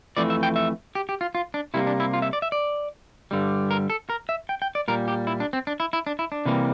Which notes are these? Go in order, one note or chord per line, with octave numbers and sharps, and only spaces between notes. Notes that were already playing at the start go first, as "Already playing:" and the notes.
F2 E3 A3 D5
E5
G5
E5
G4
G4
F4
F4
D4
C3 G3 A#3 E4
D4
E4
F4
E5
D5
E5
D5
G2 D3 G3
A#4
A4
A#4
E5
G5
G5
D5
A#2 G3 A#3 A#4
G4
E4
D4
C4
D4
E4
E4
D4
E4
D4
C3 E3 G3 A#3